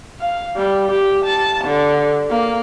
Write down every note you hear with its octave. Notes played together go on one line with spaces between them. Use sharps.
F5
G3
G4
A5
D3
A#3